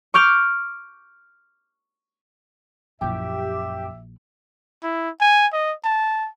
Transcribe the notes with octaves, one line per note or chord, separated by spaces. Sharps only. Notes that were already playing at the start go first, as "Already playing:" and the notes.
C#6 D6 F6 G6
A#1 F#2 E4 G4 E5
E4
G#5
D#5
A5